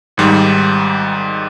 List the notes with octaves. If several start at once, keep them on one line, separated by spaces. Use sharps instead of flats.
G#1 G#2 D#3 G3